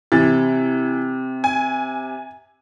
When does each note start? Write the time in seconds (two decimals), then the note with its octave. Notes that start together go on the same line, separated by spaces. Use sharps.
0.12 C3 E3 A6
1.44 G#5